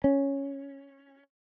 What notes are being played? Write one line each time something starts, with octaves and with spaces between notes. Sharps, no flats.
C#4